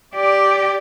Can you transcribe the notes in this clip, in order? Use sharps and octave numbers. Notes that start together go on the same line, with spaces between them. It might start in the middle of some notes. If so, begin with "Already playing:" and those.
G4 D5